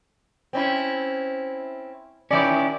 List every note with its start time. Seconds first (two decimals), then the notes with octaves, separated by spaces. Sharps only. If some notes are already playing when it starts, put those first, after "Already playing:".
0.53 C4 C#4 E4
2.31 D#3 F#3 C#4 E4 G4 D5